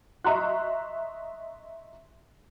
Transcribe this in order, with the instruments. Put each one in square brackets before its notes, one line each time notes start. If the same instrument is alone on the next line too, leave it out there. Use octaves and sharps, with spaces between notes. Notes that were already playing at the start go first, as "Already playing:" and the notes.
[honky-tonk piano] D#5 E5 A#5 C6 C#6 F#6